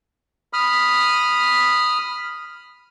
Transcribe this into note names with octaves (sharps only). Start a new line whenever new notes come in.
B5 D#6 F6